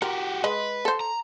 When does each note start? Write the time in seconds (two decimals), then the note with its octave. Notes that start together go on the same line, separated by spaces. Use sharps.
0.02 F#4 G4 A#4
0.44 G#3 B4 D#5
0.85 A4 C5
1.01 A#5